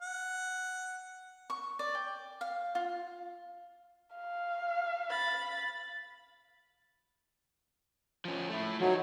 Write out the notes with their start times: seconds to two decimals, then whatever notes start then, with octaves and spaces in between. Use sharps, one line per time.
0.01 F#5
1.50 C#6
1.79 D5
1.95 G5
2.41 F5
2.75 F4
4.16 F5
5.09 B5 A6
8.25 F3 C#4
8.50 A3 E4
8.80 F3 F#3 D#4